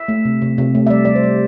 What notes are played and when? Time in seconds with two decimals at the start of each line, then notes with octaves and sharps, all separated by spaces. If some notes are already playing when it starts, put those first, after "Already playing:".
Already playing: E5
0.08 A3
0.25 C3
0.42 C3
0.58 C3
0.75 A3
0.87 E5
0.90 G3 D5
1.05 G3 D5
1.15 C5
1.24 G3